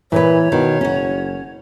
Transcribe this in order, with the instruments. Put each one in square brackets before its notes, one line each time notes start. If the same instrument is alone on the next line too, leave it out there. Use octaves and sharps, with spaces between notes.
[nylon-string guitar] A#2 B4 [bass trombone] E3 [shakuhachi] C#5
[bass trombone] B2 [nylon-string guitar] D#3
[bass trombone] F#1 [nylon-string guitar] C#4 F#4